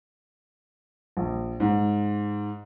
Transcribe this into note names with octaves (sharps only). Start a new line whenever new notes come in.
A#1
G#2